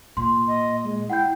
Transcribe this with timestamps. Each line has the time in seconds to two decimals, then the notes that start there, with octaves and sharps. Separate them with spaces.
0.17 A#2 C6
0.48 D#5
0.84 G#3
1.10 E4 F#5 G5 G6